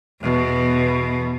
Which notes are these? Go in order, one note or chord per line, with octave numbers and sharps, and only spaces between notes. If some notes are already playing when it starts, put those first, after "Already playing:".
E2 B2